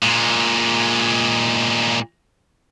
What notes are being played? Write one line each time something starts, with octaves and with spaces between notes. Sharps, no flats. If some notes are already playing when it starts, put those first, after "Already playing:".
A#2 G#3